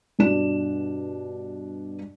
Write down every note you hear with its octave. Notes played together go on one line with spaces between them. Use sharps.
G2 B2 D4 E7